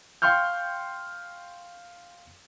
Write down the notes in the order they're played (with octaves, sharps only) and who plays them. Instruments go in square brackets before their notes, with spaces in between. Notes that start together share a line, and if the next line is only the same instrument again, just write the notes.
[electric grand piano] F5 G5 C6 C#6 F6 G6